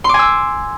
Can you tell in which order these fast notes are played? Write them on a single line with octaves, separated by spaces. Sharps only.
C6 D6 G#5 E6